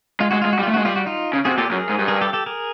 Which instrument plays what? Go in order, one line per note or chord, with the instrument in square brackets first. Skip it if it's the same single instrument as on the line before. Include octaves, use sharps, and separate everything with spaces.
[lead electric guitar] G#3 [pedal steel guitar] F4
[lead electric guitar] G#3 [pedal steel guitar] F#4
[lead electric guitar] G#3 [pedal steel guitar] F4
[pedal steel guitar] F#4
[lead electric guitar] G3
[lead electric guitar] A3 [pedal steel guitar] F4
[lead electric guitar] G#3 [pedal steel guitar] F#4
[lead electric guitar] G3 [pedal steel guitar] F4
[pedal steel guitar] F#4
D#4 F4
[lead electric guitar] C#3
[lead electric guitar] C3 [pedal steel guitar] F#4 G#4
[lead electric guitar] A#2 [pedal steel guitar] G4 A4
[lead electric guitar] F#2 [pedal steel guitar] G#4 A#4
[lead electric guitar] G#2
G2
[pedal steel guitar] G#4 A#4
G4 A4
G4 A4
G#4 A#4